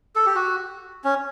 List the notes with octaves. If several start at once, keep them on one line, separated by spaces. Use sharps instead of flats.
A4
G4
F#4
C#4